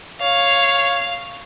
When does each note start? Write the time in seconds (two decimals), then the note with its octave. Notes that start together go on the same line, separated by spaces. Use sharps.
0.21 C#5 F5